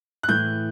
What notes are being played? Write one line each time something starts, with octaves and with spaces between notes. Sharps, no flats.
F#6
A2 E3 G6